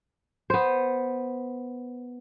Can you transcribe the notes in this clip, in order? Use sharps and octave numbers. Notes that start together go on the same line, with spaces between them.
B3 C5